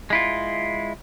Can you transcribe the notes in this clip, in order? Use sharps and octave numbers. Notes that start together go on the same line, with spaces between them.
G#3 E4 F4